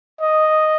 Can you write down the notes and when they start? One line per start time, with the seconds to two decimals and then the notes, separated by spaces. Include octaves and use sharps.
0.21 D#5